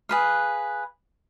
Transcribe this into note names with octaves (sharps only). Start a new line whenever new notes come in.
G#4 B4 F5